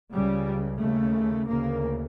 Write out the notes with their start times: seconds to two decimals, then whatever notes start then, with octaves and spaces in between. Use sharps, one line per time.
0.12 C#2 C#3 G3
0.80 D#2 C#3 A3
1.48 D2 C#3 A#3